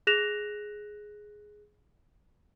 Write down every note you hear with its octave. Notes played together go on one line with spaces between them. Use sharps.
G#4 F#6 A#6 E7 F7